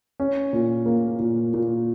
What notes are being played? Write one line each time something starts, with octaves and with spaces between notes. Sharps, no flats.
C#4
A#2
A#3
A#2
A#2